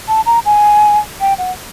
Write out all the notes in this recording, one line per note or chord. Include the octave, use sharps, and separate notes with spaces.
A5
A#5
G#5
G5
F#5